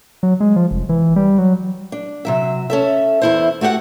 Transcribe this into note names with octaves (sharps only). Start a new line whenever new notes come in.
F#3
G#3
F3
F1
E3
G3
F#3
D4
C3 F#3 E5
C#4 A4 E5
E2 E4 C5
A3 F#4 G4 D5 F#5